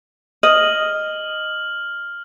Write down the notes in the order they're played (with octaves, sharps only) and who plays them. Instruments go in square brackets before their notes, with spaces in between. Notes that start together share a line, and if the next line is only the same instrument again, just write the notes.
[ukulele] D#5 [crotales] F6 F#7